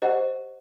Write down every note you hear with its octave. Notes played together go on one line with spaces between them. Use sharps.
G4 C5 D#5 F#5